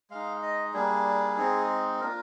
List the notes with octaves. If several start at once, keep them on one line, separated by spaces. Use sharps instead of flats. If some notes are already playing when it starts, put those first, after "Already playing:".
G#3 D#4 F5
D#5
G3 A#3 D4 G#4
G#3 C4 D#4
A#3 D4 F4 A#4